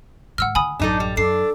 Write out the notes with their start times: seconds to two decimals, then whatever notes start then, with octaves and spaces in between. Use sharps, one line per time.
0.38 G#2 D3 F#5 E6 F6
0.55 D3 G#5 B5 D#6
0.80 A1 F#2 D4 D#4 A4
1.00 G3
1.17 F#2 D4 A4 C7